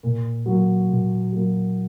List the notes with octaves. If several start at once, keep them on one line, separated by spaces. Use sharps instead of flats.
A#2
F#3 A#3
A#2
F#3 A#3